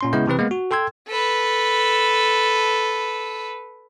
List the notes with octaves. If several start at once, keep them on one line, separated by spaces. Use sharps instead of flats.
A#2 C#4 C6
C#3 G#3 B3 E4 D#5 G6
C3 E3 C4 B4
G#3 A#3 B3
F#4
A4 G5 C6 E6 G#6
A4 B4